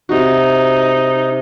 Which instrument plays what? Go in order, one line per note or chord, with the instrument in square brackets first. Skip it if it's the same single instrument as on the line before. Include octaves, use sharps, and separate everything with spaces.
[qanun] C3 F#4 [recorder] D#4